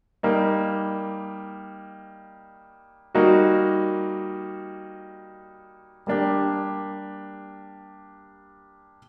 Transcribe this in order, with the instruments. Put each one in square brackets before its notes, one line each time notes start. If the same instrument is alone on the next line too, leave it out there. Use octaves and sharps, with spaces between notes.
[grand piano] G3 A#3 D#4
G3 A#3 D#4 F#4
G3 A#3 D4 G4